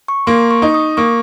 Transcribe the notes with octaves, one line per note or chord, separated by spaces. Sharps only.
C#6
A#3 C6
C#6
D#4
D#6
A#3 C#6